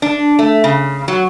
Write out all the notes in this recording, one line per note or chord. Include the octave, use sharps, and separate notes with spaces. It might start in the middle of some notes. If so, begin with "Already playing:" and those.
D4
A3
C#3
F#3